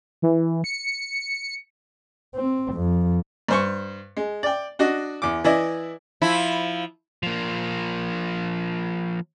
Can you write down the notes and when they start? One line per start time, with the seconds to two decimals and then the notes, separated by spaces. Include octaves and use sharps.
0.22 E3
0.64 C#7
2.35 C4
2.74 F2
3.48 G2 C5 C#6
4.17 G#3
4.43 D5 G5
4.79 D4 F#4 D#5
5.22 E2 D6
5.44 E3 E4 D5 D#5
6.22 F3 E4
7.23 F3 A#3